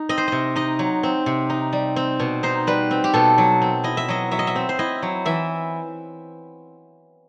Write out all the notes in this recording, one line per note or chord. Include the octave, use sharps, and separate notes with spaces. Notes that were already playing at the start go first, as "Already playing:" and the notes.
Already playing: D#4
C4 D#5
C5
C3 D#5
D#4 D#5
F#3
C4
C3
D#4
G3
C4
B2
D#4 C5
G3 B4
C4
G4
B2 A4
F#3
C4
E4 D#5
E5
F#3 D#5
F#3 E5
D#5
E5
C4
C5
E4 D#5
F#3
E3 E5